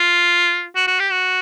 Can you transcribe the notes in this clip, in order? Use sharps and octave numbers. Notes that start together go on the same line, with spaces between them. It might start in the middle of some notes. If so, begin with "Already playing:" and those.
Already playing: F4
F#4
F#4
G4
F#4